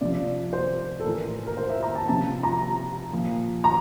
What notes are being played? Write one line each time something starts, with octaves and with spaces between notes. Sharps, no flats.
C3 F3 D5
C5
A4
A2 E3 A#4
A#4
C5
E5
A#5
A5
C3 F3 A5
A#5
A#2 F3
A#5